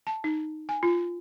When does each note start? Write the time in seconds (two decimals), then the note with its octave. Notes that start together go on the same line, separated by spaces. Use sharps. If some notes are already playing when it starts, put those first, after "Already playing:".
0.07 A5
0.24 D#4
0.69 G#5
0.83 F4